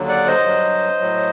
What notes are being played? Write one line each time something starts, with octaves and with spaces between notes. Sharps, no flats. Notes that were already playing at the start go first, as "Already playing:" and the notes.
Already playing: D#2 D3 F#3
D5 F#5
C5 D#5
G2 F#3
A2 F#3